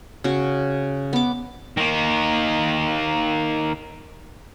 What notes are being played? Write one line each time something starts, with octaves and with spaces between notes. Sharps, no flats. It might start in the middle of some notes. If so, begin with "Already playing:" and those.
C#3 F#4
B3 D6
D#3 A#3